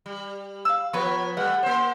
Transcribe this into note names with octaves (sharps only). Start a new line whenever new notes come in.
G3
F5 E6
F3 B3 B4 C#5
G3 A3 F#5
A#3 C5